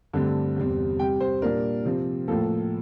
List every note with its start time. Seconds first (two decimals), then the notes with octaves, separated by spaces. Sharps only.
0.14 G2 D3 A3 C4
0.56 E2 C3 G3 C4
0.99 C3 G3 C4 G5
1.21 C5
1.42 A#2 G3 D4 A#4
1.85 C3 F3 C4
2.28 A2 F3 A#3 A4